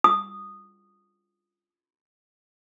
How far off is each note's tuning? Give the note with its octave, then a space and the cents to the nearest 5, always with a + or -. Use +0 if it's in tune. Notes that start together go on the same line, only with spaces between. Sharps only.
D#6 -10